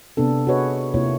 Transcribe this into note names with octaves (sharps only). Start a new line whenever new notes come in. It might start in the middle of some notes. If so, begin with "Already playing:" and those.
C3 B3 D4 A4
F#4 G#4 B4 C#5 D#5
C3 A#3 E4 F4 C#5